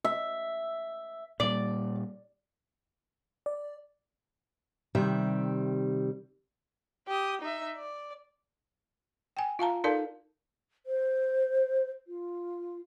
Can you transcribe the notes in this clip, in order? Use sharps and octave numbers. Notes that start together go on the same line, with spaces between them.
E5
A#2 G3 D5
D5
C3 D#3 G3 E5
G4 D#6
D#4 E5
D5
G5 G#5
F4 F5 A5 A#5
D#4 A4 A#4 D5 F5 A5
C5
F4